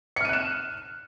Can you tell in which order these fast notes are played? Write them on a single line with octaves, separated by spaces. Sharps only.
C#7 F6 D#7 F#6 E7